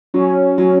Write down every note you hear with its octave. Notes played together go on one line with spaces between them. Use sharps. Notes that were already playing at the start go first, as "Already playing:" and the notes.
F#3 C#4
F#3